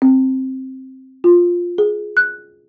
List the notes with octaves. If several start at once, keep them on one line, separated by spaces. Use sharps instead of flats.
C4
F4
G#4
F#6